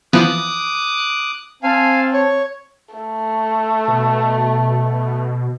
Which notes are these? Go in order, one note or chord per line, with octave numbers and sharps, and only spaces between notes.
E3 F3 B3 D6 D#6 F#6
C4 F5 G#5 A5
C#5
A3
B2